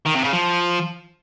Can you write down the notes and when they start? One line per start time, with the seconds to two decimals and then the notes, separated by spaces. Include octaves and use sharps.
0.06 D#3
0.15 C3
0.24 C#3
0.33 F3